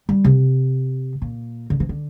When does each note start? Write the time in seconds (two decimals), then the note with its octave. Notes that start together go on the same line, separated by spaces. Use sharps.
0.09 G3
0.24 C3
1.22 A#2
1.70 D3
1.80 E3
1.89 D3